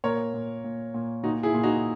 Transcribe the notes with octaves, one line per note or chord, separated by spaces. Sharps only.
A#2 A#4 C#5
A#2
A#2
A#2
A#2 D#4 F#4
E4 G#4
A#2
D#4 F#4